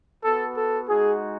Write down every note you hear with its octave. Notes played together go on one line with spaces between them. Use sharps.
B3 F#4 A4
A4
G#3 D#4 F#4 G#4